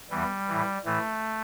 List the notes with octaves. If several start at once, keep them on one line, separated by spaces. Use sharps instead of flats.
E2 E3 G3
A2 E3
A2 E3 A3